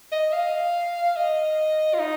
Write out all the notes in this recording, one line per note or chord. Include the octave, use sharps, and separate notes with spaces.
D#5
F5
D#5
F4
D#4